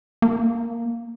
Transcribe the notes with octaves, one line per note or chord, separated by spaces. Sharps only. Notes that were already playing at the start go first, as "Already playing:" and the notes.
A#3